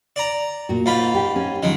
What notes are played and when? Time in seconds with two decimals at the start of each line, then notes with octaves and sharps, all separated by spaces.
0.16 D5 A#5
0.69 A#2 F#4
0.86 G#2 F4 B5
1.15 G4
1.36 C#4
1.63 D#3 F3 G3 G#3